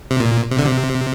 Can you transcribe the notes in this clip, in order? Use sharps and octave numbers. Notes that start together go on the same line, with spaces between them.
C3
A#2
C3
D3
C3